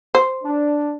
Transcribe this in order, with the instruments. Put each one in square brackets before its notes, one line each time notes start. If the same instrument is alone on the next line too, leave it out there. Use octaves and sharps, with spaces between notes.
[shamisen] C5
[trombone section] D4